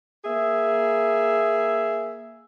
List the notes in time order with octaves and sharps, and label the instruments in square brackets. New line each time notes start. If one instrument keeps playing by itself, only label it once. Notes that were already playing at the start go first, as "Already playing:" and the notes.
[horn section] A#3 G#4 E5